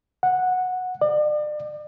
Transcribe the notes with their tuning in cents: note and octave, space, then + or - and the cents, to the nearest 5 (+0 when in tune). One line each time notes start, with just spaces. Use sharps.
F#5 -10
D5 +40